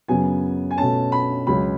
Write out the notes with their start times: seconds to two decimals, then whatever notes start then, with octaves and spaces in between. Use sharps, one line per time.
0.08 F#2 C#3 F#3 B3 G#5
0.71 G#5
0.78 B2 A3 C#4 A5
1.12 B5
1.47 C#2 C#3 F#3 C#4 B5